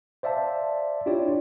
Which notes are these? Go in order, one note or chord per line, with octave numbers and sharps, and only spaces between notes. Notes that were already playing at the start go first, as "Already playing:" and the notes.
C5 D5 E5 F5 A5
D4 E4 F4 G4 C#5 D5